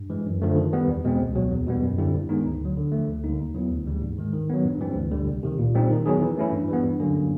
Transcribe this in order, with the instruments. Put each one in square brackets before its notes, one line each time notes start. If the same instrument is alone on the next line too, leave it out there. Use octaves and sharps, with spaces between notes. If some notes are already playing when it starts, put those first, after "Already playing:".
Already playing: [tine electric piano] G2
E3 G#3
F#2
D3 F3 A3
D#3
G3 B3
E2
B2 G#3 C4
C#2
B2 F#3
E2
B2 G3 B3
F#2
D3 G3 C4 E4
G2
D#3 G#3 B3 D#4
D2
D3 F#3
D3
A3
F3
D2
D3 G3 A#3 D#4
D#2
C#3 F#3 B3 E4
D2
C#3 E3 G3 A#3
G#2
D#3 G#3
D#3
F#3 B3
G2
E3 G3 C4
D2
D3 G3
C2
C3 D#3
A#2
G3 C4 D#4
D#3
F#3 B3 D#4 G#4
E3
A3 C#4 E4
G2
E3 G3 B3
G2
D3 F#3 A#3 C#4